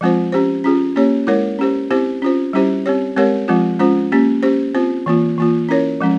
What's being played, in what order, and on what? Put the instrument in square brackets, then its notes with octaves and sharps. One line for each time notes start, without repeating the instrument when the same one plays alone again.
[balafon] F3 G#3 C4 F4 C5
C#4 G4 C5
C#4 F4 G#4
A#3 C#4 G4 C#5
G#3 E4 A#4 C#5
C#4 G4 C5
C4 E4 G4 C5
C#4 F4 C5
G3 C#4 E4 G4 C5
C4 G4 C#5
G#3 C4 G4 A#4 C#5
F3 G#3 C4 F4
G#3 C#4 F4 C5
A#3 C#4 G4
C#4 G4 C5
C4 F4 C5
E3 A#3 F4
E3 A#3 F4
C#4 E4 A#4 C#5
F3 G#3 C#4